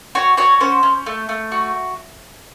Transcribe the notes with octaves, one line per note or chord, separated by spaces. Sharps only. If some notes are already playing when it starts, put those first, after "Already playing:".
F#4 C#5
F#4 C#5
C#4 C5
C#4
A3
A3
F#4